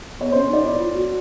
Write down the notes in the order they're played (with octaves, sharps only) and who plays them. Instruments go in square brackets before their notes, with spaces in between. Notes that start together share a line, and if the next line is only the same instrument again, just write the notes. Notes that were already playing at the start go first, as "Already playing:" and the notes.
[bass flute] B3 [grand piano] C#5
[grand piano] C5
[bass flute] C#4
[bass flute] D#4 [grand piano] D5
[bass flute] E4
F4
F#4